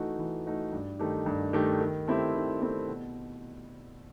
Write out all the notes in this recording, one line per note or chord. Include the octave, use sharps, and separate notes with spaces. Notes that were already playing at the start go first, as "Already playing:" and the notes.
Already playing: E3 A3 D#4 F#4
E3
A3 D#4 F#4
G2
D#3 A3 D#4 G4
G2
D#3 A3 D#4 G4
D#3
A3 C4 E4 G4
D#3
A3 C4 E4 G4
B2